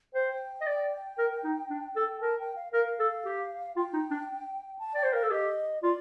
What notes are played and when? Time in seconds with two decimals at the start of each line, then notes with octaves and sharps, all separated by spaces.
0.14 C5 G5
0.61 D#5
0.67 D5
1.18 A#4
1.44 D#4
1.70 D4
1.96 A4
2.21 A#4 A5
2.39 G5
2.56 F5
2.73 A#4 F5
2.99 A4
3.25 G4
3.76 F4 G5
3.93 D#4
4.11 D4
4.79 A5
4.94 D5 G5
5.03 C5
5.13 A#4 F5
5.22 A4
5.31 G4 D#5
5.82 F4 D5